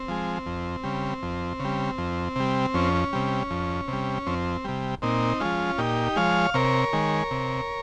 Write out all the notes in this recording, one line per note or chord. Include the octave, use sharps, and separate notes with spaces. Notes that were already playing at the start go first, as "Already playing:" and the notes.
Already playing: C4
F3 G#3
F2
C#3 G3
F2
C#3
G3
F2
C3 G3
F2 C#4
C3 G3
F2
C3 G3
F2 C4
C3 G3
A#2 C4 D#4
F3 G#3 C#4 F4
A#2 D#4 G4
F3 G#3 C#5 F5
C3 A#4 C#5
D#3 G#3
C3